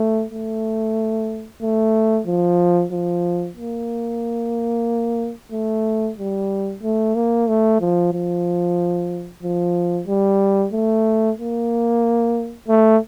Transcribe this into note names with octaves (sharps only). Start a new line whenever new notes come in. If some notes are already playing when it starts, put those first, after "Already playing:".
Already playing: A3
A3
A3
F3
F3
A#3
A3
G3
A3
A#3
A3
F3
F3
F3
G3
A3
A#3
A3